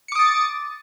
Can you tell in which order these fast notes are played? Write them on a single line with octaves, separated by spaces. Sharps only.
C#7 D6 D#6 A6